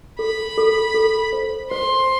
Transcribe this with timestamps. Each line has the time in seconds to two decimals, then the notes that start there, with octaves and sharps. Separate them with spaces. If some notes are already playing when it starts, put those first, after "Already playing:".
0.19 A4 B5
0.57 A4
0.94 A4
1.33 C5
1.71 C5 C6